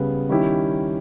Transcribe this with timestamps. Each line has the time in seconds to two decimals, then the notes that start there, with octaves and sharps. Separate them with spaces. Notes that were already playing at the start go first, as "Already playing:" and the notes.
Already playing: C#3 G3 B3
0.29 D#3 G3 C#4 E4 G4